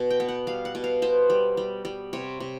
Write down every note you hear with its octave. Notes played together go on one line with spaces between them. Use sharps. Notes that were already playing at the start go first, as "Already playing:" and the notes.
Already playing: B2
G5
B3
F#5
G3 F5
F#5
B2
F5
B3 C5
G3
G3
G3
C3 C#5
C3